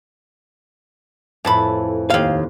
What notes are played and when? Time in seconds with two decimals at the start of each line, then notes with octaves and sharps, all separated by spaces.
1.45 F2 A2 E3 A5 B5
2.10 D#2 F5